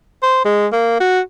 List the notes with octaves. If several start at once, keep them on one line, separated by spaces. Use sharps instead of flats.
C5
G#3
A#3
F#4